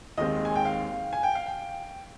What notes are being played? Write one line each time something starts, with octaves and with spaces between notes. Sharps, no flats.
D#2 D#3 G#3 C4 D#5
G#5
G5
F5
G#5
G5
F5
G5